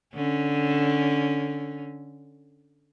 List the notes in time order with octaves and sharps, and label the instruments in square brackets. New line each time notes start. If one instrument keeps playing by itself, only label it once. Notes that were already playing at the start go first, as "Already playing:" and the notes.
[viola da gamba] D3 C#4